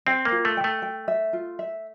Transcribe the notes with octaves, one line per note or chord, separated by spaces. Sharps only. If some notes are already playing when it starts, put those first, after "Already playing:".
C4 G5
A#3
F4
A3
G5
A3
G5
E5
F4
E5